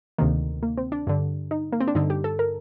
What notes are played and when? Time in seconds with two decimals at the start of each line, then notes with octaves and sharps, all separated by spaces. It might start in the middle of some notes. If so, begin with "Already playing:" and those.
0.18 D2 C3 D#3 A#3
0.63 A#3
0.78 C4
0.92 D4
1.07 G2 D3
1.51 D#4
1.72 A#3
1.80 C4
1.88 D4
1.95 G2 D3 D#4
2.10 G4
2.24 A4
2.39 A#4